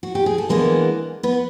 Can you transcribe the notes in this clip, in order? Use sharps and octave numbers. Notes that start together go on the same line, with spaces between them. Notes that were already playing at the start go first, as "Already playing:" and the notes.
F#4
G4
G#4
A4
E3 G#3 A#3 B3 D4 A#4
B3 B4